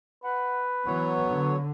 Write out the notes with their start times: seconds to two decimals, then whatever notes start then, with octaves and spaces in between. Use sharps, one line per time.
0.24 B4 F#5
0.86 E3 F#3 B3 C#5
1.28 D3